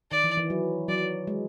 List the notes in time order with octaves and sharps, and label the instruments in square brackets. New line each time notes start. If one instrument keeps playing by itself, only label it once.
[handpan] D#3 [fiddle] D5
[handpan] E3
E3
F#3
[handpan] F#3 [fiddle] D5
[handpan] G#3